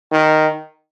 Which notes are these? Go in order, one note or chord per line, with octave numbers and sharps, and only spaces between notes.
D#3